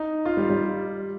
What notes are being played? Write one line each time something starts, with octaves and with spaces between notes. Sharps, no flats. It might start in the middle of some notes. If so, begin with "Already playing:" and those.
Already playing: D#4
F4
G3
G3